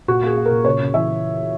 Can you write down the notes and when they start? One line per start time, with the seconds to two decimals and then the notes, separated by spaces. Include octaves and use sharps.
0.08 A#2 F#4
0.23 A#3 G#4
0.36 A#3
0.46 A#4
0.51 A#2
0.65 C#3 C#5
0.80 C#3
0.94 E3 E5